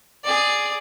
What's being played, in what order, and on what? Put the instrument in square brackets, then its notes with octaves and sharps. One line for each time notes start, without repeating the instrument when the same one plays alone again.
[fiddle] G#4 D5